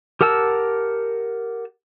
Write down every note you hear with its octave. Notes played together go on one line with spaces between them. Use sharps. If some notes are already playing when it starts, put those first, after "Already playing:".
G4 A#4 F#5 A5 E6